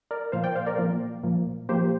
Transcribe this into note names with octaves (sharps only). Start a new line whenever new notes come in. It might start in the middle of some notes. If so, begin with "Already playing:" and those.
A#4 D5
A#2 F3 A#3 C5 F5
D5 G5
C5 F5
A#4 D5
A#2 F3 A#3
A#2 F3 A#3
A#2 F3 A#3 G4 C5